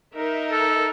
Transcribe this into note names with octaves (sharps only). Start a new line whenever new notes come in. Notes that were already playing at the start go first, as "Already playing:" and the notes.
D#4 A#4 E5
A4